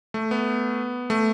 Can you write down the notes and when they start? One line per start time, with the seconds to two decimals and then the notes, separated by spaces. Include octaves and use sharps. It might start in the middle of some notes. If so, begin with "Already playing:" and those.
0.14 A3
0.31 B3
1.10 A3